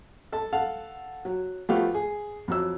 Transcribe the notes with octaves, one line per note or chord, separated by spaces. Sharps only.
A4 A5
A4 F5 F#5 A5
F#3
F3 A3 B3 F#4 G4 F5
G#4
F2 F#3 E6